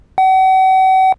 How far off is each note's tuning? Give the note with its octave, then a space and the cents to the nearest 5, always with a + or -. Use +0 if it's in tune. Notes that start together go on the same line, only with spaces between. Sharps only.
F#5 +40